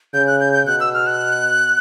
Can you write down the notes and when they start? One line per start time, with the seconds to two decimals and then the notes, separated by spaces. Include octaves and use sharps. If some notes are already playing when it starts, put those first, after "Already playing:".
0.14 C#3 G6
0.27 F#6
0.41 G6
0.53 G6
0.66 B2 F#6
0.80 E6
0.94 F6
1.07 F#6